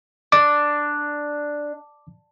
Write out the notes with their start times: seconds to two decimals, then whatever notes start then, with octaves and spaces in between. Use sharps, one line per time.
0.32 D4 D6